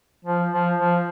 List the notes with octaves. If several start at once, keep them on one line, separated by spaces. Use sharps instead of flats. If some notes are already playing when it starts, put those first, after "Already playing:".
F3
F3
F3